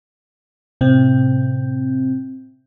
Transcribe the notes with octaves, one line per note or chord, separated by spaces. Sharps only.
A2 C3 C4